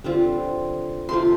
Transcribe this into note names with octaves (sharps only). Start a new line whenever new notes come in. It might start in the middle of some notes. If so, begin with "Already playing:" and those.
D3 G3 C4 F4
C3 A3 C4 F4 C6